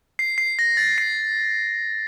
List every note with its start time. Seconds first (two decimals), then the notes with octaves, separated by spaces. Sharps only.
0.19 C7
0.38 C7
0.59 A#6
0.77 A6
0.98 C7